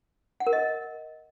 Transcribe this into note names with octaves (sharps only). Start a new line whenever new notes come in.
F#5
A#4
D#5